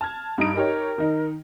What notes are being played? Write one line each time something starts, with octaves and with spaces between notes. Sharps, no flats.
A5 F6 G#6
G2 D#4 D7
D#4 G4 A#4 C#5
D#3 D#4